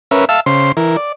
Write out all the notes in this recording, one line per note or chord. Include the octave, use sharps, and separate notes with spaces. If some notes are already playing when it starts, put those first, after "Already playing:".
C#4 A#4 B4 E5
E5 F5 A5 E6
C#3 C5 C6
E3 A#4
D5